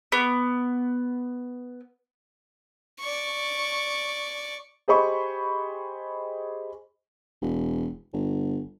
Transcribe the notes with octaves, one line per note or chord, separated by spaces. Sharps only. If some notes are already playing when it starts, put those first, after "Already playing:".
B3 D6
D5 C#6
G4 G#4 C5 D#5 B5 C#6
E1
G1